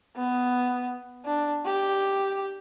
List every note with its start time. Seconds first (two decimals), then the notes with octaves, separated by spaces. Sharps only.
0.16 B3
1.25 D4
1.66 G4